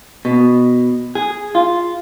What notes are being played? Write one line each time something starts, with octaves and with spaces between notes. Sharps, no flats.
B2
G#4
F4